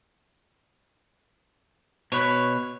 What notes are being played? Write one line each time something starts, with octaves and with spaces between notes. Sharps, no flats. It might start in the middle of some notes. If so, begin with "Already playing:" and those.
B2 B4 C#5